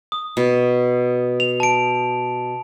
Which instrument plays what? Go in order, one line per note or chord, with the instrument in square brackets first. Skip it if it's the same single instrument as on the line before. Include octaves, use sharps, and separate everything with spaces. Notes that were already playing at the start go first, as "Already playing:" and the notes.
[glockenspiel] D#6
[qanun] B2
[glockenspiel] F7
A5 D7